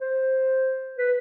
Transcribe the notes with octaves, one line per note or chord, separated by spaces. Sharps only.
C5
B4